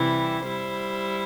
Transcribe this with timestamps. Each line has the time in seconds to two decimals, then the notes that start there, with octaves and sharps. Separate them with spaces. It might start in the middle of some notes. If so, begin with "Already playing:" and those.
Already playing: C3 E3 G3 E4
0.45 G3 E4 C5